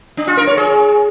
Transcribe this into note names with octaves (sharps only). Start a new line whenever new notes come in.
D4
F4
A#4
C#5
G#4